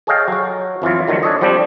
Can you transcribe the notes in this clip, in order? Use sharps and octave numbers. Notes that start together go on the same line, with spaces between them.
G#4 A4 C#5 D#5 F5 G5
F#3 F#4
F2 E3 F#3 F4
D3 D#3 F#3 A3
D4 A4 C#5 D#5
F3 G3 C4 D4 G4